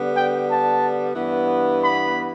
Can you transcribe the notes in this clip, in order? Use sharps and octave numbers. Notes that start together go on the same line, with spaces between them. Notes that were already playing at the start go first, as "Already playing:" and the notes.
Already playing: D3 G3 B3
G5
A5
G2 E3 B3
B5